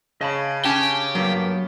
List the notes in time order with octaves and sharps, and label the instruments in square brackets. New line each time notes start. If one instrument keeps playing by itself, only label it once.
[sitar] C#3 [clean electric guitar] D#5 A5 B5
[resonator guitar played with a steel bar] C#4 G#5 [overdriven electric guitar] G4 [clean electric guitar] A5
[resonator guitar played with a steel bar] G2 A#3 [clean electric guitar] F#3 B3